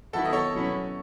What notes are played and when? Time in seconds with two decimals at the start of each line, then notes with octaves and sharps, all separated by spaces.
0.13 D#3 F#3 B3 E4 F#4 A4
0.25 D#5
0.33 A4 C#5
0.53 B2 F#3 C#4 E4